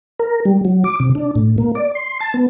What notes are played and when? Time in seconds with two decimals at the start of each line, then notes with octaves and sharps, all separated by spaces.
0.19 A#4
0.45 G3
0.65 F#3
0.84 D6
1.00 C3
1.15 D4
1.35 A2
1.58 A#3
1.75 D5
1.95 C6
2.20 A5
2.34 B3